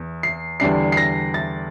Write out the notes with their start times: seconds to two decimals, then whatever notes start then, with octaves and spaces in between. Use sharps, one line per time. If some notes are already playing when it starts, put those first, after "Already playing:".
Already playing: E2
0.23 C7
0.60 E2 D3 G3 D4 C7
0.92 C7
0.97 A#6
1.34 A6